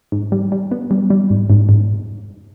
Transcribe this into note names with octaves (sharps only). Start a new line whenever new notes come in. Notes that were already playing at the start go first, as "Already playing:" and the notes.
G#2
G3
G3
B3
G3
G3
G#2
G#2
G#2